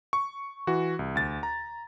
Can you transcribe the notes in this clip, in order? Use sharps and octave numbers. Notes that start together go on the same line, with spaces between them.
C#6
E3 F#4
C2
D2 A6
A#5